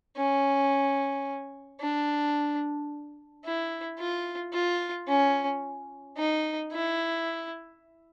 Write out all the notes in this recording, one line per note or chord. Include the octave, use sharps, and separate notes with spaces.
C#4
D4
E4
F4
F4
C#4
D#4
E4